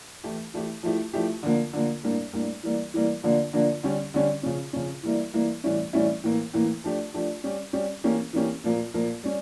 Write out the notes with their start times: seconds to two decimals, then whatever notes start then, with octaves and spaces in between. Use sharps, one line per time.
0.24 E3 A3 E4 G4
0.54 E3 A3 E4 G4
0.83 F3 A3 E4 G4
1.14 F3 A3 E4 G4
1.43 D3 F3 A#3
1.73 D3 F3 A#3
2.03 A2 G3 A#3 D4
2.33 A2 G3 A#3 D4
2.63 E3 G3 A#3
2.94 E3 G3 A#3
3.23 D3 F3 A#3 D4
3.53 D3 F3 A#3 D4
3.83 D3 G3 C#4 G4
4.14 D3 G3 C#4 G4
4.43 C#3 F3 C#4
4.73 C#3 F3 C#4
5.03 E3 G3 A#3 E4
5.33 E3 G3 A#3 E4
5.64 A2 E3 G3 C#4 E4
5.93 A2 E3 G3 C#4 E4
6.24 A2 E3 A#3
6.54 A2 E3 A#3
6.84 F3 A3 D4 G4
7.14 F3 A3 D4 G4
7.44 G3 C#4 G4
7.73 G3 C#4 G4
8.04 E3 A#3 C#4 G4
8.33 E3 A#3 C#4 G4
8.64 A#2 F3 A#3
8.94 A#2 F3 A#3
9.23 G3 C#4